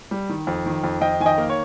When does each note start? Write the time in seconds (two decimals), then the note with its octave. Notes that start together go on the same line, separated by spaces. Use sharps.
0.11 G3
0.29 D#3
0.47 F2
0.66 D#3
0.84 F2
1.01 F2 D#5 G5
1.20 D#3 G#5
1.26 D#5 G5
1.38 A#3
1.50 C#5